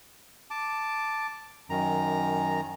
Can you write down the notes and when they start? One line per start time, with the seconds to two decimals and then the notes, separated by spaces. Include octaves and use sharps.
0.51 A5 D6
1.70 F#2 D#3 A#5